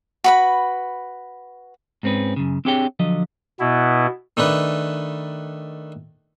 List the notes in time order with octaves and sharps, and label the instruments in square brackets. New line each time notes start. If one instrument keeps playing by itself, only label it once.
[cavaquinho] F#4 B4 B5
[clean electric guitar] G#2 G#3 C4 C#4 B4
F#2 C#3
C4 D4 G4 G#4 C#5 G5
D3 F3 F#3 D#5
[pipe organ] B2 B3 E4
[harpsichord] D#3 A3 D4 B4